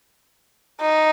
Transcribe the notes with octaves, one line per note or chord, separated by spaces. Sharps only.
D#4